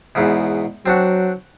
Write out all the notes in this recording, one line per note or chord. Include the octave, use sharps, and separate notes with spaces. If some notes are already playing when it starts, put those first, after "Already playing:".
E2 G#2 B2
F#3 C4 D4 F#4